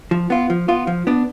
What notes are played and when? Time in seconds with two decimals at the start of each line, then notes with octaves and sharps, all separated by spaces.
0.11 F3
0.30 B3 F4
0.50 F3
0.68 B3 F4
0.87 F3
1.07 B3 D4